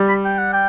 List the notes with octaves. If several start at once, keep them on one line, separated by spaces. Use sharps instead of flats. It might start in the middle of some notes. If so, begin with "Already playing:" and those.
Already playing: G3
B5
G5
F#5
G5